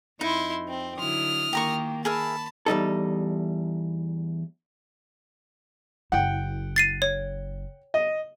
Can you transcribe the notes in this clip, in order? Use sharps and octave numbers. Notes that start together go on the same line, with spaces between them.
F2 D#4 E4 C6
C4
D3 F#3 E4 D#6 F6
D#3 A#3 G4 A#5 C#6
G#4 A#4 E5 A5 B5
E2 G3 D#4 A4
F#1 E4 F#5 G5
A6 C7 D#7
C#5
D#5